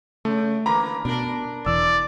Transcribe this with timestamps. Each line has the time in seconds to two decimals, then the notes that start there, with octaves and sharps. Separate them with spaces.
0.25 C#3 A3
0.66 D3 E3 A#3 A#5 B5
1.05 B2 D4 A#4
1.66 E1 E3 D5 E6